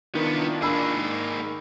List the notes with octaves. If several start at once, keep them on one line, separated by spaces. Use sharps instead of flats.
C2 D#3 B3 D4 E4 F4
A#3 G#4 B5 E6
G#2